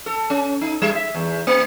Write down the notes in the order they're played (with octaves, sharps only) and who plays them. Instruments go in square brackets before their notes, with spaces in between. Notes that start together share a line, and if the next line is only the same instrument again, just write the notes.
[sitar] A4
C#4
D#4
G3
E5
E2
A#3